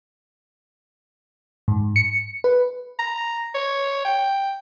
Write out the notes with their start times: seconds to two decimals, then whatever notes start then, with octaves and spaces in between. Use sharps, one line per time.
1.68 G#2
1.96 C#7
2.44 B4
2.99 A#5
3.54 C#5
4.05 G5